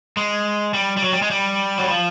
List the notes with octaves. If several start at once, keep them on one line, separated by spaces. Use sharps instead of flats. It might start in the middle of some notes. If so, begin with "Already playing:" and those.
G#3
G3
G3
F#3
G3
G#3
G3
F#3
F3